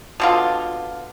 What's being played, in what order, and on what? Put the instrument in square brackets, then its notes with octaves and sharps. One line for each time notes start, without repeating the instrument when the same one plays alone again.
[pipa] B2 D3 F4